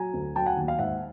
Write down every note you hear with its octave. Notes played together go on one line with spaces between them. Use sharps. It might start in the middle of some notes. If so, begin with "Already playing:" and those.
Already playing: F#3 G#5 A#5
D2
F#3 G5 A5
F#5 G#5
D#2
F5
G#2 E5 F#5